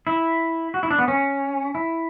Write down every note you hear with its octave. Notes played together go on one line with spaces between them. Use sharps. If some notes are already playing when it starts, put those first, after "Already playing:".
E4
F#4
E4
D4
B3
C#4
E4